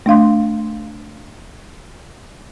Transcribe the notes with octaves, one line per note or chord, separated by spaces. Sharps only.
A3 D4 F5 C6